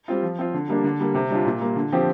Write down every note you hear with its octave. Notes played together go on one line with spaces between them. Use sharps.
G3 C4 F4
F3
C4 F4
D3
G3 A#3 D4
D3
G3 A#3
C3
G3 D4 F4
A#2
G3 A#3
D3
F3 C4 G4